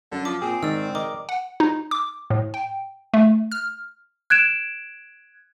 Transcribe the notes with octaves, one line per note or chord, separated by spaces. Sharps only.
F#2 D3
F3 D6
A#2 C4 G#4
G#2 D#3 D5 E6
A#4 D#5 D6
F#5
D#4
D6
A2
G5
A3
F6
F#6 G#6 D7 E7